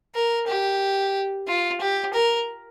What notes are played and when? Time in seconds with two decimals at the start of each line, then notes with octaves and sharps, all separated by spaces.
0.15 A#4
0.48 G4
1.48 F4
1.81 G4
2.14 A#4